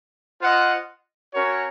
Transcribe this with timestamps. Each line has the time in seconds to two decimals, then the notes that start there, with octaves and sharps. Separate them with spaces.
0.41 F4 C5 D#5 F#5
1.34 C#4 F#4 A#4 C#5